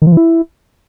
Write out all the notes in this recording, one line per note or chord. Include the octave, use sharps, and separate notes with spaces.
D#3
F3
E3
E4